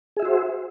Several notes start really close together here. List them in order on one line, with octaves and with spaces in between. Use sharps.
G#4 E5 F#4 C5